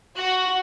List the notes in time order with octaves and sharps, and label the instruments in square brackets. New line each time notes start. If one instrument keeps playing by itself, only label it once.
[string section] F#4